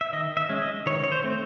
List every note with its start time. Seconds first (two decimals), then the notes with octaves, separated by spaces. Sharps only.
0.01 E5
0.13 D#3 D#5
0.37 E5
0.49 G#3 C#4
0.62 D#5
0.86 D#3 C#5
1.04 C#5
1.12 C5
1.24 A3 C4